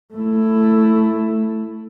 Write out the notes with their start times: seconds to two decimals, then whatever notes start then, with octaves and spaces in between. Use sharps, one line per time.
0.14 A3 E4